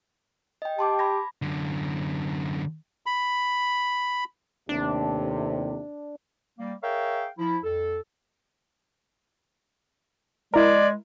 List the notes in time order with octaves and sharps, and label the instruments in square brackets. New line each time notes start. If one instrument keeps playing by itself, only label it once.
[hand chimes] D#5 G5
[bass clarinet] G4 [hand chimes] A5 C6 D6
[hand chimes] B5 G#6 A#6
[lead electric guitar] F#2 D3
[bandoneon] B5
[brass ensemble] D#2 A2 C3 [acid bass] D4
[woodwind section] G3 A#3
G#4 A#4 C#5 E5 F5 G5
F3 E4
F2 A4
[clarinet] G#3 [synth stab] E4 A#4 [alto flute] D5